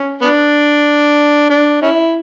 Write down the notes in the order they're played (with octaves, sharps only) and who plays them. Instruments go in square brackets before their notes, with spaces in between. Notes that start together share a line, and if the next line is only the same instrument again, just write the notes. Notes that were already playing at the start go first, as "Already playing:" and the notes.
Already playing: [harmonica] C#4
B3 D4
D4
C#4 E4